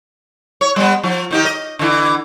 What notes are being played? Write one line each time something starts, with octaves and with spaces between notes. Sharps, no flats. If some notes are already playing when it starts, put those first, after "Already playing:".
C#5
G3 B3
F3
D#3 D#4 G4
D#5
D3 E3